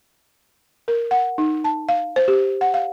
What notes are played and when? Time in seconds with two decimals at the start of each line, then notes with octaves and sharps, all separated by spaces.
0.88 A#4
1.11 F#5
1.38 D#4
1.64 A5
1.89 F5
2.16 C5
2.28 G4
2.61 F#5
2.74 F5